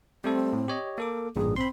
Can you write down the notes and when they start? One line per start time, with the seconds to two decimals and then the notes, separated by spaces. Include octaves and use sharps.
0.24 G3 A3 C4 A4
0.53 A2
0.68 G4 C#5 D#5
0.98 A#3 A4 A#4 D6
1.36 A1 G2 A#2 G#4
1.56 C4 B5 C6